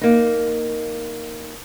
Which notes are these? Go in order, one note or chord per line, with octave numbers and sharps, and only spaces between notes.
A#3 D#4